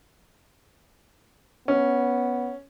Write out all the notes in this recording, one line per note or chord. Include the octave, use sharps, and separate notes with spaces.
B3 C#4